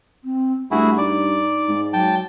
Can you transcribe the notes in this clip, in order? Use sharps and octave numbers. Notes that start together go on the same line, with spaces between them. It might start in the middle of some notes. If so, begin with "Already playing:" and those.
C4
G2 A3 E4 F#4 G#4
D#4 D5
G#2
F#3 G5 A5